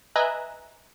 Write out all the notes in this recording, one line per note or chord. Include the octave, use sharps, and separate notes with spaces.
B4 D#5 E5 G#5 A#5 F#6